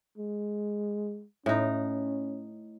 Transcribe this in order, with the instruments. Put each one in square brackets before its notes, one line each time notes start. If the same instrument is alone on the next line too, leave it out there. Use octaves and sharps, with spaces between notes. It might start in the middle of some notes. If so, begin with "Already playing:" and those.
[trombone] G#3
[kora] A2 D#4 [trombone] C#4